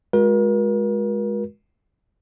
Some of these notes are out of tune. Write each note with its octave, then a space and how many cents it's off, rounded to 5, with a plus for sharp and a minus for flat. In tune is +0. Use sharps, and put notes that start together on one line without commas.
G#3 +0 F#4 -30 A#4 +40